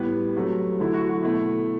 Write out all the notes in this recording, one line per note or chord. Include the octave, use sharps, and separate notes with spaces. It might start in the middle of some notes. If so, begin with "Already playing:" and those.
Already playing: A2 G3 B3 B4
C3 F#3 A3
D3 F#3 A3 E4
F#4
F#4
B2 A3 E4